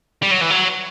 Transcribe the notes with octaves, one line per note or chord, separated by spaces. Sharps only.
G3
F#3
E3
F#3